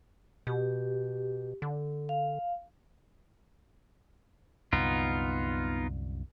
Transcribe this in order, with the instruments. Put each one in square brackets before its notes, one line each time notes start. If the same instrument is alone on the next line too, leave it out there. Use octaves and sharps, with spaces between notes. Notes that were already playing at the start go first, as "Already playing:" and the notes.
[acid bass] B2 [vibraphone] G4
[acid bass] D3
[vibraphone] F5
[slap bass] C2 F#2 D3 [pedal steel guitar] B3 D#4 F4